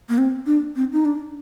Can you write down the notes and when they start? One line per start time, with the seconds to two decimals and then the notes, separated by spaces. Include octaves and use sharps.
0.09 A#3
0.18 C4
0.46 D4
0.76 C4
0.93 D#4
1.05 D4